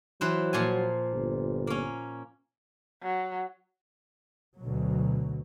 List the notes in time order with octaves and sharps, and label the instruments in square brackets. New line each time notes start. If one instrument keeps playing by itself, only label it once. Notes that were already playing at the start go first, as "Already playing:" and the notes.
[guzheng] E3 B4 C5 [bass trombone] F#3
[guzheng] A#2 F3 G#5
[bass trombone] G1
[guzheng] A#3 C#4
[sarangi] F#3
[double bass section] D2 B2 F#3